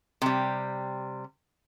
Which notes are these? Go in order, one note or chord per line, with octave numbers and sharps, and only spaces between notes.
C3 G3